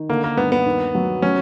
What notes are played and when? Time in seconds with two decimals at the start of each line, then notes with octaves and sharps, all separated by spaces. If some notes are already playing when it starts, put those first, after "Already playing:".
Already playing: D#3
0.09 D3 A#3
0.24 A#3
0.37 G2 B3
0.52 B3
0.66 D#2
0.95 F#3
1.22 F#3 C#4